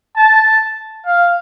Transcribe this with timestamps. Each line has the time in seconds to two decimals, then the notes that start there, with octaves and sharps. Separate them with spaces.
0.16 A5
1.06 F5